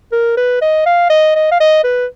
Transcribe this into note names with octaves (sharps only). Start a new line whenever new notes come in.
A#4
B4
D#5
F5
D#5
D#5
F5
D#5
B4